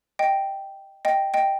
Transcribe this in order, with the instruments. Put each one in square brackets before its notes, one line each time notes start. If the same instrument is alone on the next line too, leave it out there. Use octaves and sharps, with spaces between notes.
[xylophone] D#5 G5
D#5 G5
D#5 G5